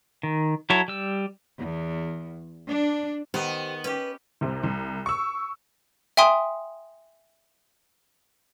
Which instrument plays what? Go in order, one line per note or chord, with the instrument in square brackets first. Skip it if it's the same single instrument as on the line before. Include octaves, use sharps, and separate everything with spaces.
[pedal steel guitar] D#3
F#3 E4 A4 C#5
G3 E6
[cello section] E2
D4
[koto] D#3 D#5 [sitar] B3 [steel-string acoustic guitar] G4 C5
[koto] C#4 G4 [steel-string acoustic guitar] B4
[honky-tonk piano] C2 C3
C2
C#6 E6
[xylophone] E5 G5 G#5 C6 D#6